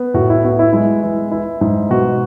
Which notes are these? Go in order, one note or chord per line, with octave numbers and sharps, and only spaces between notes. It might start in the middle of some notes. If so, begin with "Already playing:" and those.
Already playing: B3
A2 F#4
E4
B3 F#4
E4
G#3 E4
E3 E4
E3 E4
G#2
B2 F#4